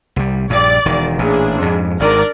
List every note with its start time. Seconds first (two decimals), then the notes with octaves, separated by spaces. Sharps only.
0.16 C2 G3
0.50 A#1 G2 D5
0.85 E1 D#3
1.19 A1 A#2 D4 G#4
1.62 F2 G#2
2.00 G#1 D#3 D4 A#4 D5